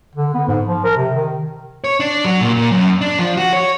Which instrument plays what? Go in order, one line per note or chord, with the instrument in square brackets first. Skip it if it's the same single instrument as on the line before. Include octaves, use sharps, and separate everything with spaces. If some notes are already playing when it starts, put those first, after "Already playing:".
[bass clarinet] D3
B3
G#2
F3
A#4
C3
D#3
[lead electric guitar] C#5
D4
F#3
A#2
A#2
F#2
D4
F3
F#4
C#5